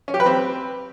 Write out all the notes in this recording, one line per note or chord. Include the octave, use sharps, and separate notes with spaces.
C#4
G4
B4
C4